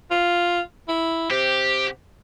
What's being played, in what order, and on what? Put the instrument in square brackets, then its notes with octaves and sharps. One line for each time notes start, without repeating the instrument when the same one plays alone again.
[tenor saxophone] F4
E4
[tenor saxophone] C3 [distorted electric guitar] G4